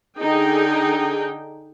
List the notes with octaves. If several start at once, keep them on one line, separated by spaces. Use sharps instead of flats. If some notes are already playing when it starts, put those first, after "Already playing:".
D3 D#4 G#4 G5